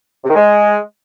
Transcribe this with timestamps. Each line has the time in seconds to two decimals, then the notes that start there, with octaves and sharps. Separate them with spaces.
0.24 C3
0.30 D#3
0.35 G#3